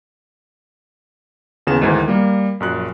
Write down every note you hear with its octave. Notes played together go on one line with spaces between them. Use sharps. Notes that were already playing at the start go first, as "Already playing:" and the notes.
D#2 C#3 E3 B3 E7
D2 G#2 D#3 E3
G3 A#3
A#1 F#2 F#6